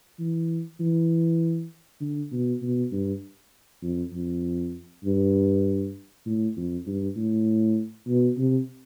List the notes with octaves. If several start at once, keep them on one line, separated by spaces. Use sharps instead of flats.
E3
E3
D3
B2
B2
G2
F2
F2
G2
A2
F2
G2
A2
B2
C3